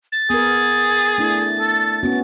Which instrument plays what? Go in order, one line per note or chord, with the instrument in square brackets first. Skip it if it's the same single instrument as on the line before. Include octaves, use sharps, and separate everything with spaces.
[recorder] A6
[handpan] B3 A#4 [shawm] G#4
[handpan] A3 D4 E4
[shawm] A4
[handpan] B3 C#4 F#4